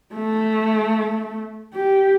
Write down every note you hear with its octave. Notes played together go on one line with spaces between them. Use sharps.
A3
G4